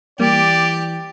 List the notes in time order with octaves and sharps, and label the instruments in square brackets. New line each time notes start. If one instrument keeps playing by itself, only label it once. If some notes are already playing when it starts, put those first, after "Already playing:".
[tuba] E3 [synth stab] G3 A#3 [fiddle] G4 [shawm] D5